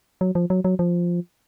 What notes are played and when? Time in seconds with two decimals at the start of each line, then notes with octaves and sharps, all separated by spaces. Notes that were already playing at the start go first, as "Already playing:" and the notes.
0.21 F#3
0.35 F3
0.50 F#3
0.65 F#3
0.79 F3